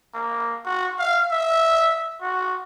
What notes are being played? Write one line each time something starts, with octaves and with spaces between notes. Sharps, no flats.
A#3
F#4
F5
E5
F#4